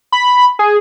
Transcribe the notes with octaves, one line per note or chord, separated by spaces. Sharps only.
B5
G#4